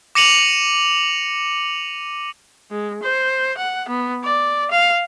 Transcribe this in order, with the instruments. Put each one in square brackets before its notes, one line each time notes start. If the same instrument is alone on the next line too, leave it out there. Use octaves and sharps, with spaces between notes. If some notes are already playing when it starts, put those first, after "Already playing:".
[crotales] D6 A#6 C#7 D#7 F7 F#7
[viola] G#3
C5
F#5
B3
D5
F5